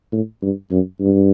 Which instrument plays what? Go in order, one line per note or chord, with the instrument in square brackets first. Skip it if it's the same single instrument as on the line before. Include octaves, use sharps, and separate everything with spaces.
[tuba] A2
G2
F#2
G2